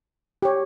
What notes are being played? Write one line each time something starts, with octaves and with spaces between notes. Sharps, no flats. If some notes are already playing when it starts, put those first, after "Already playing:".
G4 C#5